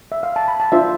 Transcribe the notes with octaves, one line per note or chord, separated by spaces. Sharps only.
E5
F5
A5
B5
A5
D4 F4 C5 E5